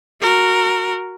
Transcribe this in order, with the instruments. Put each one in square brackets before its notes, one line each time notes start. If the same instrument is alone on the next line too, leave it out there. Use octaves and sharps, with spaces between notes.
[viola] F#4 A#4